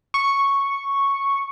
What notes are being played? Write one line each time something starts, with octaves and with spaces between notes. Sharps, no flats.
C#6